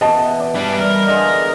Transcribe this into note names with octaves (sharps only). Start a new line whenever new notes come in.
B2 E3 D#5 A5
D5
E3 G3 D4
G3 A#4
D3 G#3 F4 D#5